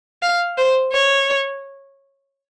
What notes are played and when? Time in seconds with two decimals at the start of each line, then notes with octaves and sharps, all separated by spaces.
0.23 F5
0.58 C5
0.92 C#5